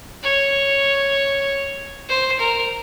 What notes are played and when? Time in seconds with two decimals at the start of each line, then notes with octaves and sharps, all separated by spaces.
0.23 C#5
2.09 C5
2.39 A#4